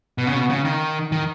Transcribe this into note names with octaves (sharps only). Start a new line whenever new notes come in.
B2
C#3
B2
C#3
D#3
D#3